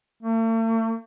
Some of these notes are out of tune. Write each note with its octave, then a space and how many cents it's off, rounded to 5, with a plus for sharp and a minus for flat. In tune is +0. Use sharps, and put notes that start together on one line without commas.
A3 +45